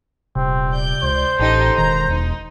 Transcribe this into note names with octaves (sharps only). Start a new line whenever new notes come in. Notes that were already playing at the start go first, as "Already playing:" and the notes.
D#1 C3 C4
D5 G6
C#2 C5
A1 A2 D#4 G4 A4
E1 D#3 A#5
E2 D#4